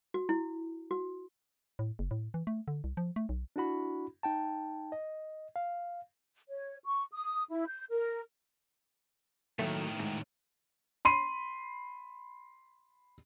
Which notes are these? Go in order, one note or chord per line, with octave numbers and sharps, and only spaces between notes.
F#4
E4
F#4
A2
F#1
A2
E3
A3
D3
C2
F3
A3
B1
D4 E4 F#4 B5
D#4 G5 A5
D#5
F5
C#5
C#6
D#6
E4
G6
A#4
D#2 A2 D#3 F#3 A3
G#2
B5 C6 D#7